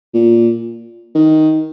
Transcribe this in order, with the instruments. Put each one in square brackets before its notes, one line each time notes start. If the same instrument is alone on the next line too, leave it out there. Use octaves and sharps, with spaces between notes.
[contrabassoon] A#2
D#3